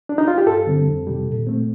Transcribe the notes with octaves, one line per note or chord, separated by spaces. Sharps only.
D4
D#4
F4
G4
G2 A4
D3 G3 C4
F2
C3 D#3 G3
A#2
A3 C4